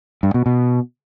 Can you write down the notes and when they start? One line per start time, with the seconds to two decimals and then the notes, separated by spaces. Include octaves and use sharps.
0.23 G2
0.34 B2
0.46 B2